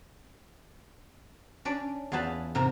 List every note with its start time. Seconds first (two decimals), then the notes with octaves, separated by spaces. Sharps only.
1.65 C#4 D4 D5
2.12 E2 F4 G#4 B4 A5 B5
2.55 G#2 C3 A#4 A#5